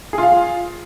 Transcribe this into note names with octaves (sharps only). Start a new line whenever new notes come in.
F4 G#4 F5